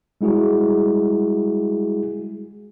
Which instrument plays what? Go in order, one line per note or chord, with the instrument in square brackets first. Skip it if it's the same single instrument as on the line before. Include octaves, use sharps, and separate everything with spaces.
[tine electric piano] G3 G#3 E4 F#4 G#4